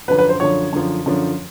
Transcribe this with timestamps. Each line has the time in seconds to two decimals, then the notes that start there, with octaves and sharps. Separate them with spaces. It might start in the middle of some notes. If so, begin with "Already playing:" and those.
0.08 F#2 D3 F3 B4
0.19 B4
0.29 C5
0.40 F#2 D3 F3 C#5
0.73 F#2 D3 F3
1.06 F#2 D3 F3